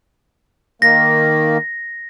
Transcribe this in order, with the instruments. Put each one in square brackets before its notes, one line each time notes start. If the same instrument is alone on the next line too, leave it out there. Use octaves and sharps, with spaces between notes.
[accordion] D#3 A#3 [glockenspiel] A#6